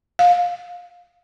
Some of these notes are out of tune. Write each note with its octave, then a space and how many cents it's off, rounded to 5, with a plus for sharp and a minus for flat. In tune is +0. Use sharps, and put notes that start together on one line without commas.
F5 +20